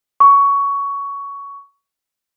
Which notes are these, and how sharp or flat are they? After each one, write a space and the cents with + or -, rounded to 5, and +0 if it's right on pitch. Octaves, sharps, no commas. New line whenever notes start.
C#6 +15